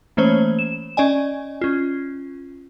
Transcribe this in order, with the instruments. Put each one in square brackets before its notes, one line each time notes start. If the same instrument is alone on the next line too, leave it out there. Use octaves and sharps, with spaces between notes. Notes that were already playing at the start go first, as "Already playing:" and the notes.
[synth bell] E3 A3 A#3 C#4 C5 C#5
E7
C#4 D5 D#5 G#5
C#4 F4